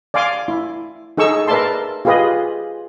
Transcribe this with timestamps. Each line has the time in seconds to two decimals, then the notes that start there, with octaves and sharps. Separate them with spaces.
0.14 D5 F5 G#5 C6 D6
0.48 E4
1.17 D#4 G#4 A4 C#6 E6
1.48 A#4 B4 D5 E5 A5 C6
2.05 F4 G4 G#4 B4 D#5